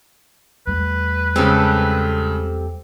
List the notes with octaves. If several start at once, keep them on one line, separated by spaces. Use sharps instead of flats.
E2 G3 A3 B4
C#3 G#3 C4 G4 A4